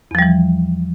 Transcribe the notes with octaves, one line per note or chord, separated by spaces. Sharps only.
E2 E3 F3 G3